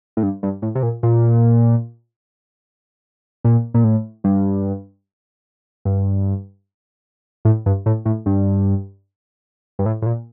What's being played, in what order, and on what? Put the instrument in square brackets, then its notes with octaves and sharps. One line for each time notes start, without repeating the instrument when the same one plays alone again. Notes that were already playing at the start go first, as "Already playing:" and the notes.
[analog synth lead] A2
G2
G2
A2
C3
A#2
A#2
A#2
A#2
A2
G2
G2
A2
G2
A2
A2
G2
G2
A2
A2
A#2